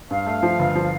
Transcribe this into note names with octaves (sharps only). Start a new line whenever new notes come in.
G2 F5
A3
F3
G1
F3